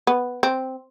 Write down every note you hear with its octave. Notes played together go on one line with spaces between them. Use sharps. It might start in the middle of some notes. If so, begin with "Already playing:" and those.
B3
C4